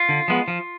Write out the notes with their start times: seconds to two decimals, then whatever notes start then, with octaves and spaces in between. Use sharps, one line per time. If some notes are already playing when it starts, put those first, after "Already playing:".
Already playing: F4
0.09 D3
0.28 F3 G#3 B3
0.48 F3